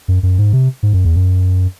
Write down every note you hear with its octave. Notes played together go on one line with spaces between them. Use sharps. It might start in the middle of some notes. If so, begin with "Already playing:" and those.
F#2
F#2
G#2
C3
G#2
F#2
E2
F#2